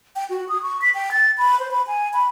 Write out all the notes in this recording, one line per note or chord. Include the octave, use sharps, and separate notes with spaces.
G5
F#4
D#6
C#6
B6
G5
A6
B5
C5
B5
G#5
B5